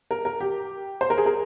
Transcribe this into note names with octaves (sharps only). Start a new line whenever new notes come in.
A#4
A#4
G4
C5
A#4
G#4
A#4